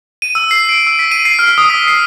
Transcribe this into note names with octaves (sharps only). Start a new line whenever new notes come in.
D#7
E6
C7
D7
E6
B6
D#7
C7
F6
D#6
B6
C7